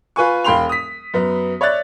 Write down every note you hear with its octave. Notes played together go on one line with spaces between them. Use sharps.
F4 B4 G#5 C#6
E1 F5 G5 B5 C6 F7
D#6 B6
F#2 B3
C#5 D5 E5 F#6 A6